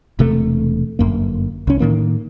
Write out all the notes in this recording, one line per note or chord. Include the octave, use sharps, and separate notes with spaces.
E1 C3 A3
G1 F#2 A#3
C2 C#4
A2 D#3 A#3